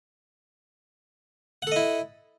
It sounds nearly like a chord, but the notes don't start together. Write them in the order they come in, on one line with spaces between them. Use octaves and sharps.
F#5 A4 D#5 E4